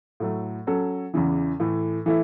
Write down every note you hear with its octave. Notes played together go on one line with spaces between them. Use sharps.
A2 F#3 A3
F#3 C#4 A4
E2 C#3 E3
A2 E3 A3
E3 A3 E4